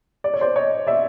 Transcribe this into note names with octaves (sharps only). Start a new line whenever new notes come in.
D5
C#5
C5 D5
C#5 D#5
D5 E5